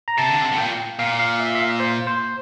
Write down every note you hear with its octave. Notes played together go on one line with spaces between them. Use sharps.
A#5
C3 A5
D3
C3
A2
A#2 G5
A#2 F5
F5
E5
E5
F5
C5
C5